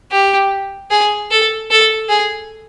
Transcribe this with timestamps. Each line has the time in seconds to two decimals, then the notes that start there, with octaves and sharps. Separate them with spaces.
0.11 G4
0.91 G#4
1.31 A4
1.71 A4
2.09 G#4